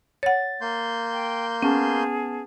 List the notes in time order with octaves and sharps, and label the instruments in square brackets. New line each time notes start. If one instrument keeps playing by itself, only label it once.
[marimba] C#5 F#5 [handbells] A6
[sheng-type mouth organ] A#3 C6 G6
[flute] G5
[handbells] B3 A5 [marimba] C#4 [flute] G#4